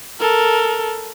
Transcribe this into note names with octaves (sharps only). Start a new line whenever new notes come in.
A4 A#4